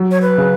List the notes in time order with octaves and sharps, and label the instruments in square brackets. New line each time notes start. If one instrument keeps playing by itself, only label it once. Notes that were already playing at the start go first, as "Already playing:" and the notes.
Already playing: [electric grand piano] F#3
[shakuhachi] C#5
B4
[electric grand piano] C#3